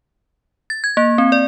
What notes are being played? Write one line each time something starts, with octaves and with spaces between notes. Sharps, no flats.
A6
G#6
A#3
C4
D5